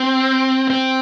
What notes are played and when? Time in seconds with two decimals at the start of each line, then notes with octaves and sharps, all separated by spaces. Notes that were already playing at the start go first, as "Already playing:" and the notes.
Already playing: C4
0.70 C4